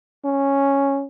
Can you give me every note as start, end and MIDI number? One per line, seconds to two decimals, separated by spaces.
0.25 1.06 61